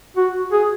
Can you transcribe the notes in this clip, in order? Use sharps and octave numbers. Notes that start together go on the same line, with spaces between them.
F#4
G#4